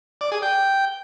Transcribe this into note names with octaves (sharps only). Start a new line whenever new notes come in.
D5
G#4
G5